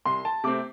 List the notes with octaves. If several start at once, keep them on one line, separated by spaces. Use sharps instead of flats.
C2 C6
A5
C3 A3 C4 D6